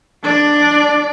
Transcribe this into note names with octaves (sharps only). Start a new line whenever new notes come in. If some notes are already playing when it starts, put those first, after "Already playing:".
D4 D5